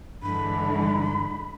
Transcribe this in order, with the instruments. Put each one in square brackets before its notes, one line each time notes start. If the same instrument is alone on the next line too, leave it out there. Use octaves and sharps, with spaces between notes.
[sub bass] G2 [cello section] D3 E3 G#3 [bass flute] D4 [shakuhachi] B5